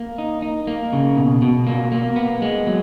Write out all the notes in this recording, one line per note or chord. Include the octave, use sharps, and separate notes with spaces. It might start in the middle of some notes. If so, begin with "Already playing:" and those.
Already playing: A#3
D#4
D#4
A#3
C#3
B2
B2
A#3
A#3
B3
G#3
F#3